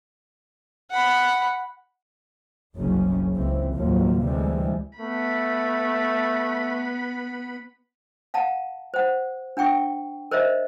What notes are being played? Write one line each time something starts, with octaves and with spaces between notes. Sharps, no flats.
F#5 B5
F#1 C2 F#2 C#3 C#4
C#2 E3 C4
D#2 A2 F3 F#3 A#3
D2 C3 E3 G3 G#3
A3 B3 B5
F5 F#5 A5 A#5
C5 F#5
D4 F#5 G5 C#6
A#4 C5 C#5 D#5 E5